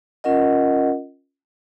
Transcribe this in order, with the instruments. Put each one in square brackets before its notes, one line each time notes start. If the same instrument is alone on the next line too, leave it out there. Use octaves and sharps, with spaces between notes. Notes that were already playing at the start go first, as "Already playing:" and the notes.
[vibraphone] C#4 F4 A#4 D#5 F#5